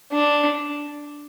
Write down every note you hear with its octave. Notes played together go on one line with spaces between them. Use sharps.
D4